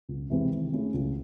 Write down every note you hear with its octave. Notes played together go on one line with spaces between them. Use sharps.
C#2
C3 E3 G#3 C4
D#3
A3 C#4 E4 G#4
C#2